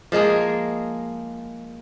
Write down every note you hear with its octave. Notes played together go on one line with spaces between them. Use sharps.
F3 G#3 A#3 G#4